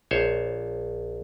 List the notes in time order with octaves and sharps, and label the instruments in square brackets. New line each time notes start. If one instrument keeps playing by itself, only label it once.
[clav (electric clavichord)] A#1 C5 C#5